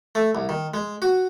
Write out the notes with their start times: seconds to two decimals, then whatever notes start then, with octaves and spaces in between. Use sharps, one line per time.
0.15 A3
0.35 C2
0.49 D#3
0.74 G#3
1.02 F#4